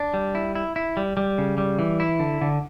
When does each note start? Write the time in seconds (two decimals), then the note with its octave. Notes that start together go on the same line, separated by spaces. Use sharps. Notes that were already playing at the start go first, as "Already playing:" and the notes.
Already playing: D4
0.14 G3
0.35 E4
0.55 E4
0.76 E4
0.97 G3
1.17 G3
1.38 C#3
1.58 G3
1.79 E3
2.00 E4
2.20 D3
2.41 D3